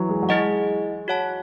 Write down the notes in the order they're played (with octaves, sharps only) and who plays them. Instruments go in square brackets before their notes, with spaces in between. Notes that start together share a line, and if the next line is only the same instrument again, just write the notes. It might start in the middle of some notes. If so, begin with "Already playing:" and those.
Already playing: [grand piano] E3 F#3
G#3
F#3
[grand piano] G#3 [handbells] E4 G#4 D#5 F#5
[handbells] F#4 C#5 F#5 A5